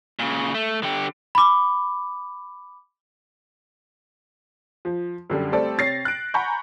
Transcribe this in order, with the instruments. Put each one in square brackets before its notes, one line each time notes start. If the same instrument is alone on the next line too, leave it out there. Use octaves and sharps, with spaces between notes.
[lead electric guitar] A#2 C#3
A3
D3 G4
[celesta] B5 D6
[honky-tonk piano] F3
F#2 D3 G3
G3 A3 C4 A4 D5
C3 C#5 A6 A#6 C7
F#6 D7
F#5 G#5 A#5 B5 C#6 G6